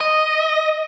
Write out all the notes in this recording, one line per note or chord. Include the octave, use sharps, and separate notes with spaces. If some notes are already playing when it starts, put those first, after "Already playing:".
D#5